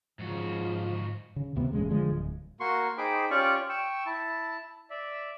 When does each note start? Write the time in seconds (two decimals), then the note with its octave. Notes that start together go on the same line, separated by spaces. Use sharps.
0.19 G#2 C#3 F3 F#4
1.36 C#3
1.56 D#2 C3 B3
1.73 E1 A1 C#3 G#3
1.89 D3 F3 G#3
2.10 D1
2.60 A#3 F#4 C6 C#6
2.98 D#4 G#4 C5 G5 B5 D6
3.31 C#4 F4 G4 D5 C#6
3.69 G5 C#6 E6
4.06 E4 A5
4.90 D5 E5